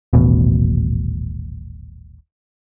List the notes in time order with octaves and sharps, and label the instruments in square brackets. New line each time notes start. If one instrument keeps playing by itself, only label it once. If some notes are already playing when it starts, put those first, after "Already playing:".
[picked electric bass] D#1 A1 B2